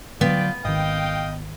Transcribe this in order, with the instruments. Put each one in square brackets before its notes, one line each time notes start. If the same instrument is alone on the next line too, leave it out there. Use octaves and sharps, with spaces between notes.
[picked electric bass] D3 E3 F#3 [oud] B3 [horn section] F4 D5 G5
[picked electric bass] G#1 D#3 [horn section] D#5 F5 G5